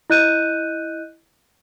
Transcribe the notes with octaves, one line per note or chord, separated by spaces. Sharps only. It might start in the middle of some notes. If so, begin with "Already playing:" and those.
E4 D#5 F#6 G6 D#7